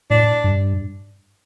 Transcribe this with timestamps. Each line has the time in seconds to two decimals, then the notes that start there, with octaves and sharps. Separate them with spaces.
0.10 A2 D4
0.44 G2